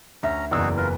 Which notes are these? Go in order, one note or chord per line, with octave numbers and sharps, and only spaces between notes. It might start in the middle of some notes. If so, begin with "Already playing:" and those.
D2 C#4 E5 A#5
F#1 E2 D#4 F#4 G#4 D5 E6
F4 A#4 B4